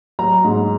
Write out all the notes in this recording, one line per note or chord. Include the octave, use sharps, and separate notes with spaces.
F#3 A#5
G#2